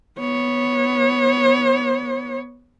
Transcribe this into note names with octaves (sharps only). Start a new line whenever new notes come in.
B3 C#5